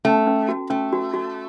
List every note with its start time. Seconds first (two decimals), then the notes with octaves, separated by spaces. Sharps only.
0.05 A3 C#4
0.27 C#4
0.49 F#4
0.70 A3 C#4
0.93 F#4
1.14 F#4